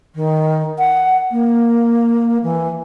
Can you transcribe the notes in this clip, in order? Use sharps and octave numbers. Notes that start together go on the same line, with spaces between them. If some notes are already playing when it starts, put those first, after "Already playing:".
D#3
F#5
A#3
E3